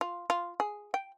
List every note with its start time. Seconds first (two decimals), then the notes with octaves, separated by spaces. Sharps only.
0.01 F4
0.30 F4
0.60 G#4
0.94 G5